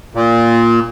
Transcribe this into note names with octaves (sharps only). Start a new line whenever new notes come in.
A#2